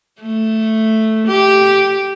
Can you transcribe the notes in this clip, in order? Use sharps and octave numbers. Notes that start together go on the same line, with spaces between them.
A3
G4